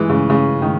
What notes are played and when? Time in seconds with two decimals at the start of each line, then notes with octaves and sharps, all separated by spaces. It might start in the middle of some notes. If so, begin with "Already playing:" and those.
Already playing: E3 G#3
0.10 C#3
0.30 C#3
0.62 D#3